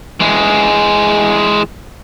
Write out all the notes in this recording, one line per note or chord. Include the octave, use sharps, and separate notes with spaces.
E3 G#3